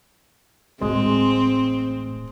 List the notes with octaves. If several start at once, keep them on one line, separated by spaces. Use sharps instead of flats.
D1 A1 G#3 C4